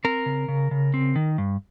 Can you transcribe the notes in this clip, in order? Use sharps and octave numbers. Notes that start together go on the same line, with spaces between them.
C4 A#4
C#3
C#3
C#3
C4
D#3
G2